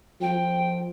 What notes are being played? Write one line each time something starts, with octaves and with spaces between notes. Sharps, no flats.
F3 G5